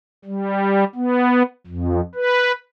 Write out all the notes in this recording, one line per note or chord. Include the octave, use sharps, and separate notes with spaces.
G3
B3
F2
B4